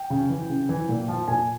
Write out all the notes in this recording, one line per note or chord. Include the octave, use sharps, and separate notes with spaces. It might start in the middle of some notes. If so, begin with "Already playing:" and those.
Already playing: G5
C#3
E3
C#3
E3
A#2
F3
A#2 G#5